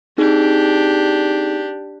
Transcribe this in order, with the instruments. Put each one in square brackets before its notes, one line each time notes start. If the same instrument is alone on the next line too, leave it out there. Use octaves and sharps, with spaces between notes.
[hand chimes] C4 D#4 G#4 [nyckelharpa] D4 G4